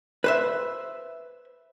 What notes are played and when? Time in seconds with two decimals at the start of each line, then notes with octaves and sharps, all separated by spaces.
0.24 B4 C5 E5